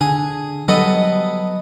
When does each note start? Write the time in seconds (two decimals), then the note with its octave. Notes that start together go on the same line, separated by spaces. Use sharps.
0.01 D3 G#4
0.68 F#3 G3 B3 A4 D#5